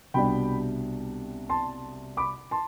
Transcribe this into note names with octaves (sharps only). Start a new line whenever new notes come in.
C2 B2 G3 D4 G5 B5
A5 C6
B5 D6
A5 C6